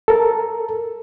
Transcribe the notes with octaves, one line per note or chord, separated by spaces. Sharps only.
A4 A#4